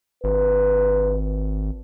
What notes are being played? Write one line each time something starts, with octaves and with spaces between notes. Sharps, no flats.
G#1 B4